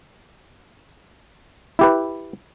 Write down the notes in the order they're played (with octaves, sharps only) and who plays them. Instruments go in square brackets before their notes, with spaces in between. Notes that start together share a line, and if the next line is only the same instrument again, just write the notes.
[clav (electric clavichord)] E4 G4 B4